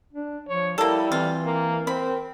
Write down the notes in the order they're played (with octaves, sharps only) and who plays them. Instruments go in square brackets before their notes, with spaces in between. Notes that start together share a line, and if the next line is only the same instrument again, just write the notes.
[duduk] D4
[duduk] F3 [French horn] C#5
[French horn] G3 [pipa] A#3 A4 [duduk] E4
[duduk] E3 [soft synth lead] C4 [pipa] F4
[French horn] A#3
[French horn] C4 [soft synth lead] A#4 [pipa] B5